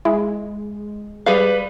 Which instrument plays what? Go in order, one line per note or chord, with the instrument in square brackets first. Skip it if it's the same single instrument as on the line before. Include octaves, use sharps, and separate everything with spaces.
[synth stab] G#3 [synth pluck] E4
[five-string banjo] G3 G#4 F5 [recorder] B4